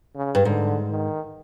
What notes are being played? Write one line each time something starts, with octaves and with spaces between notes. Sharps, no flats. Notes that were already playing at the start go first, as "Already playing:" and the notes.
C#3
G2
G#2 D3
D#3